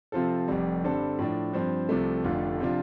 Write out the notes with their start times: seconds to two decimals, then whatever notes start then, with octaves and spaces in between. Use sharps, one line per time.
0.12 C3 F3 C4 F4 A4
0.48 F1 F2 C3 G3
0.84 G2 D3 G3 C4 A4
1.19 A2 F3 D4
1.54 G2 F3 C4
1.89 C2 C3 F3 A3
2.24 F1 F2 D3 A3 F4
2.60 C3 F3 D4 F4